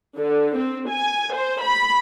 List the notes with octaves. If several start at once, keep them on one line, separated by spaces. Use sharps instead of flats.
D3
C4
G#5
C5
B5